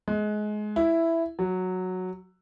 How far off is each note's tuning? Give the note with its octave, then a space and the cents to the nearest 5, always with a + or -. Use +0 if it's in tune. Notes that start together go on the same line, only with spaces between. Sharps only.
G#3 +25
E4 +5
F#3 -5